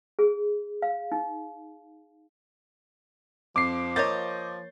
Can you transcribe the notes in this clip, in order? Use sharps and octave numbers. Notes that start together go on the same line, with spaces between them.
G#4
F5
D#4
F2 F3 D6 C7
A#3 C#5 D#5 G6 A6